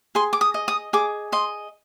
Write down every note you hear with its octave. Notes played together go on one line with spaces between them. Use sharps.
G#4 C6
D6
D#6
D#5
D#6
G#4 D6
D#5 C6